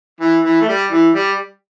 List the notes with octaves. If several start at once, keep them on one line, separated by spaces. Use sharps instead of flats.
E3
E3
A3
G3
E3
G3